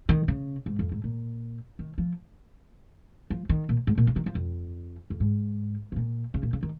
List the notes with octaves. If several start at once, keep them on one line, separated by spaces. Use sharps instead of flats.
D#3
C#3
G#2
F2
G#2
A#2
D#3
F3
F3
D#3
A#2
G#2
A#2
C#3
D#3
F3
F2
F2
G#2
C#3
A#2
C#3
A#2
C#3
D#3